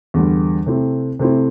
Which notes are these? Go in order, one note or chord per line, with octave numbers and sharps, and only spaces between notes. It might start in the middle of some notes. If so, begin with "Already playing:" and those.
E2 D3 G3
C3 A3 C4 E4
C3 A3 C4 E4